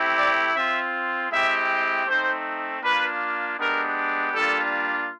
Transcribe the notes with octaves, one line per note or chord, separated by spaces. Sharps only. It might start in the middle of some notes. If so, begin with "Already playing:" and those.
Already playing: A3 C4 E4 G4
D5
C4 F4 E5
G#3 C4 E4 G4 E5
A3 C4 D#4 C5
A#3 D4 F4 B4
G#3 B3 D4 G4 A#4
G3 A#3 D4 F4 A4